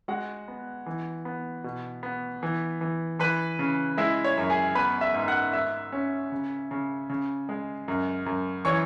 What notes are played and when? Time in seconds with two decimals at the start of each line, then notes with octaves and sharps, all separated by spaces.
0.08 G#3 F#4 F#5
0.48 B3
0.86 E3
1.25 B3
1.64 B2
2.03 B3
2.43 E3
2.81 E3
3.19 E3 B4 B5
3.59 C#3
3.98 G#3 E4 E5
4.24 C#5
4.37 F#2
4.50 G#4 G#5
4.75 B3 B4 B5
5.01 E5 E6
5.14 G#2
5.28 F#5 F#6
5.53 G#2 E5 E6
5.92 C#4
6.32 C#3
6.71 C#3
7.10 C#3
7.49 G#3
7.88 F#2
8.26 F#2
8.65 E3 C#5 C#6